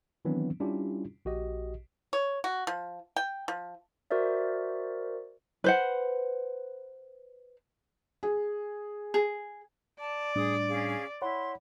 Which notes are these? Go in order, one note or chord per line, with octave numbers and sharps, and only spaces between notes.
D#3 E3 F#3 B3 C4 D4
G3 C#4 D4 E4 F4 G4
A#1 F#4 G4 D#5
C#5
F#4
F3
G5
F3
F#4 A#4 C5 D5 E5
B4 C5 F#5
G#4
G#4
D5 A5
A2 G3 D4 G#4 D#6
C#4 G#4 F5
E4 C#5 F#5 B5 C6